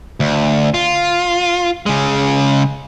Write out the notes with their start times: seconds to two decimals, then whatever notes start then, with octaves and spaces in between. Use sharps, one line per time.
0.20 D2
0.74 F4
1.86 C#3 G#3